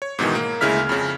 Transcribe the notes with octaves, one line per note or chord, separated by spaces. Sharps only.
C#5
G#2 B2 D#3 E3
A#3
D2 C#3 G#3 E4 F6 B6
F2 C#3